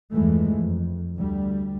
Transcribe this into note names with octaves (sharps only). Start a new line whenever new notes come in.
E2 G2 E3 F3 G#3 A3
F2
D2 G3